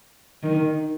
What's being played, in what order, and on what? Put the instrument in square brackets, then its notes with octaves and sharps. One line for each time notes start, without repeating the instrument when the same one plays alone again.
[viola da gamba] D#3